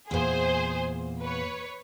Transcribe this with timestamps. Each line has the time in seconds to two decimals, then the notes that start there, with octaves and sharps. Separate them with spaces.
0.11 E2 A#2 G#4 C5
1.22 B4 C#5